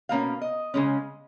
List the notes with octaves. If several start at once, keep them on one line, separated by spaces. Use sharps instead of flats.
B2 A#3 C#4 F5
D#5
C#3 G#3 C#4